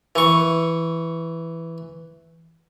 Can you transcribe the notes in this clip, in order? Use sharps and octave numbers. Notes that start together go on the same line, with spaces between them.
E3 C#6